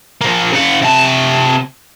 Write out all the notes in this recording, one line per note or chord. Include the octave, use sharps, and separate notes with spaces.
F3 A#3
C#3 F#5
C3 A5